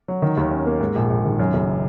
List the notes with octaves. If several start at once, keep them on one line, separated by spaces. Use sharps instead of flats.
F#3
D#3
D#2
C#4
A#3
G#2
A#1
A#1
D#3
F#2
F#1